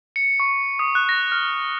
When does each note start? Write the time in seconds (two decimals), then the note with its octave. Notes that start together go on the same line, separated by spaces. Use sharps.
0.16 C#7
0.40 C#6
0.79 D#6
0.95 F#6
1.09 A#6
1.32 F6